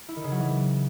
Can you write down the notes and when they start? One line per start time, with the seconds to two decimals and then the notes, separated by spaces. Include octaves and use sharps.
0.08 E4
0.16 D#3
0.24 C#3
0.31 F#3
0.39 E3